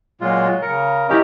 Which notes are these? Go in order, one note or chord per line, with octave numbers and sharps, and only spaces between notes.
A#2 F#3 G#3 F4
C#3 A#4 C#7
C#4 E4 G4 A#4 D#5